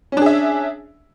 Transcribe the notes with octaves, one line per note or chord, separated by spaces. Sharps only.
C#4 D4 G#4 E5